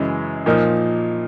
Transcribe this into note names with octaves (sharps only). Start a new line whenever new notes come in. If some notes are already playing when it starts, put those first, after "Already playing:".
Already playing: F#2 C#3 E3 G#3
A#2 F3 A#3 D#4